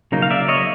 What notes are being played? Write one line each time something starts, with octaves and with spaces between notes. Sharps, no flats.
C#3 F#3 A#3 D#4
F5
D5 E5
C#5 D#5